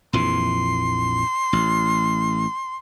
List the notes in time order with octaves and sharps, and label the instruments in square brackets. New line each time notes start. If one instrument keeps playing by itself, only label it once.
[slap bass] A#1 F2 E3 [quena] C6
[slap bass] A1